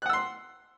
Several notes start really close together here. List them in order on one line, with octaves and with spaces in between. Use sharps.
F#6 F#5 E6 C6